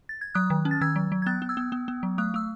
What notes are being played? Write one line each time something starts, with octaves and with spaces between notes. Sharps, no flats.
A6
G#6
F#3 D#6 F#6
D#3
C#4
A6
D#3 E6 G#6
F#3
F#3
G#6
B3 F#6 A6
B3
E6 G#6
B3
B3
B3
F#3
A3 D#6 F#6
A3 E6